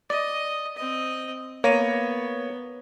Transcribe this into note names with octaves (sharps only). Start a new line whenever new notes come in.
D5 D#5
C4 D#5
A#3 B3 C#5 A#6 D#7